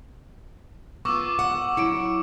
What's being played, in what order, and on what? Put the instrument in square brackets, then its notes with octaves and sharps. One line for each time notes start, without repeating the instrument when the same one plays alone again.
[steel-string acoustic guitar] B3 F4 [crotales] C#6 D6 E6
[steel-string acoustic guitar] F#5
[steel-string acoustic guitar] F#3 E4 [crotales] C#7 D7